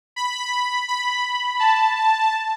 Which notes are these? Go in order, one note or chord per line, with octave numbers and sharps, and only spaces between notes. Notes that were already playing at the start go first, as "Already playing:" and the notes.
B5
B5
A5
A5